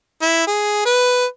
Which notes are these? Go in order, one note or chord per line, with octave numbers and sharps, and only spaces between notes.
E4
G#4
B4